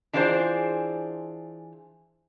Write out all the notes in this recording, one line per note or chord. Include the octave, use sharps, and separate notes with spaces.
E3 D4 F4 G#4 A4 C5